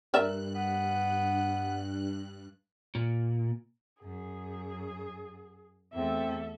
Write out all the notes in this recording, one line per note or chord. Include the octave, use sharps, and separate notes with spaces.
G2 A#4 D5 E5 F#6
B3
A#2
F#2 G#4
E2 A3 C4 A4 E5